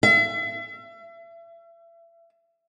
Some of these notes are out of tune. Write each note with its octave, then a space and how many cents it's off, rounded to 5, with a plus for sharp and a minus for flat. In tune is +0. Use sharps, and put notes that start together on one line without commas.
E5 +35